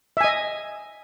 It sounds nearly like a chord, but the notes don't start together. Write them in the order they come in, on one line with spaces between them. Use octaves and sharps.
E5 G#5 D#5